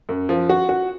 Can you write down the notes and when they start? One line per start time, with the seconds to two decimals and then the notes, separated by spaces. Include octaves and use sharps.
0.09 F#2
0.29 F3
0.49 F#4
0.69 F#4